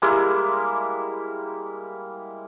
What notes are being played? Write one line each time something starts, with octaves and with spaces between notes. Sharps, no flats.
G3 G#3 A#3 E4